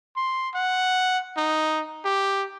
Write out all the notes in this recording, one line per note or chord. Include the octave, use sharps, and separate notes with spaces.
C6
F#5
D#4
G4